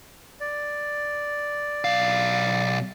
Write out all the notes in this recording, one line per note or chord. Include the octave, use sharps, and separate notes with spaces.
D5
B1 F5